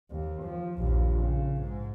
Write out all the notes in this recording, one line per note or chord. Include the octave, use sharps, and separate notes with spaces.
D#2
F3
A#1 D#2
C#3
G#2